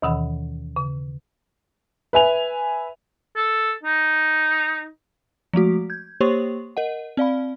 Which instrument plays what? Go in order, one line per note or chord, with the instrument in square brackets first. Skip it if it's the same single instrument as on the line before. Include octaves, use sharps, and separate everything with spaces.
[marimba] D#2 B2 D#3 E3 F#5 B5
C#3
[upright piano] B4 E5 G#5 F7
[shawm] A4
D#4
[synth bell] F3 G#3 A3 F#4
G6 G#6
A#3 G4 C5 C#5 C6 C#6
A#4 D#5 F#5
C4 D5 F5 B5